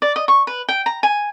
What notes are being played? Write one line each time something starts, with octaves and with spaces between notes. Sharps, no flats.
D5
D#5
C#6
B4
G5
A#5
G#5